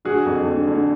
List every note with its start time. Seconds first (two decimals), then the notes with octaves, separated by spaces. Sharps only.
0.05 D3 F#4 G#4
0.26 F2
0.47 D3
0.67 D3